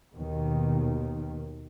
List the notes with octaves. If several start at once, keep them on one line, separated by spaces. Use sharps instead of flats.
D#2 B2 D#3